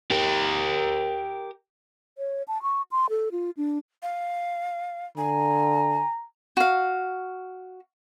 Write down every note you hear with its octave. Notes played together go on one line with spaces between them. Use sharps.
G4 A#4
C#5
A5
C#6
C6
A4
F4
D4
F5
D3 G#5 A#5
F#4 F5